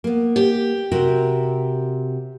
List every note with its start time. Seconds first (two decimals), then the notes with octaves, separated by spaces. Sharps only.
0.04 A#3 B3
0.36 G4
0.91 C3 F#4 A#4